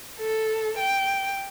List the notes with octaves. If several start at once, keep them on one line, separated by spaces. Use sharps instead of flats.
A4
G5